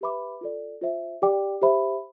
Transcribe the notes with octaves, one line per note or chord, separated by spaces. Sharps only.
G4 B4 E5 B5 D6
F4 A4 D5
F4 C5 E5
G4 D5 G5 D6
G4 C5 E5 B5